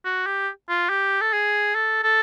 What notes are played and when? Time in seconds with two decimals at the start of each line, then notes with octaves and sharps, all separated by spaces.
0.05 F#4
0.26 G4
0.69 F4
0.89 G4
1.21 A4
1.33 G#4
1.75 A4
2.03 A4